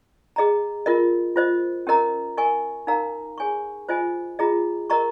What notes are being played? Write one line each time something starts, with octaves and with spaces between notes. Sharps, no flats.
G#4 D#5 A#5
F4 A#4 D#5
F4 C5 D#5
C#4 G4 A#4 D#5 A#5
A#4 D#5 G#5 C#6
D#4 A#4 F5 A#5
G#4 C#5 G#5 C#6
F4 C5 D#5 G#5
F4 G#4 D#5 A#5
A#4 D#5 A#5 C#6